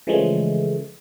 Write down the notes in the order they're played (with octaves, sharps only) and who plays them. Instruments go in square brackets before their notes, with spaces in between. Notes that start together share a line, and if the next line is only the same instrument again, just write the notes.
[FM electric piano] C#3 E3 F3 G#3 A3